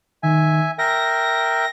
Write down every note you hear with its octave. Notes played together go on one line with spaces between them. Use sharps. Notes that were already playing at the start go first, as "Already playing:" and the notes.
D#3 E5 G#5
A#4 E5 G5 A#6